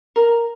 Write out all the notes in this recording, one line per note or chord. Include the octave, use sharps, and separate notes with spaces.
A#4